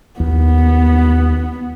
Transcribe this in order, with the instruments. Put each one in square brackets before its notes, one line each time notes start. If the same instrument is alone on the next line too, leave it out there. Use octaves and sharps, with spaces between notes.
[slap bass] D#2 [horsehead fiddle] B3